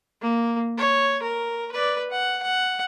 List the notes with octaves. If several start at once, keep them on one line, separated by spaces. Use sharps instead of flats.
A#3
C#5
A#4
B4 D5
F#5
F#5